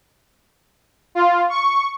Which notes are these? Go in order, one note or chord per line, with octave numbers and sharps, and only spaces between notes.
F4
C#6